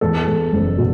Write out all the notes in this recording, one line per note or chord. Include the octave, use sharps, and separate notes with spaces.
E2 A4
E2
F#1
B2